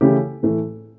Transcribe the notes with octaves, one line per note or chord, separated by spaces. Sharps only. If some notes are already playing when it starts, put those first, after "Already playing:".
C#3 E3 A3 E4 G4
A2 E3 A3